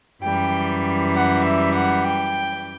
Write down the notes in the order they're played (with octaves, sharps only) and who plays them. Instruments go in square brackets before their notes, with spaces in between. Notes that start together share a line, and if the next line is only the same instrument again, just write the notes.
[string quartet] F#2 E3 G3 G5
F#5
E5
F#5
G5